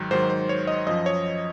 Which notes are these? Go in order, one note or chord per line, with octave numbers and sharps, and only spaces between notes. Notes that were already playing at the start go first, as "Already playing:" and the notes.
Already playing: G#2 D#3 F#3
G#2 D#3 F#3 C5
C5
C#5
D#5
F#2 F3 D#5
C#5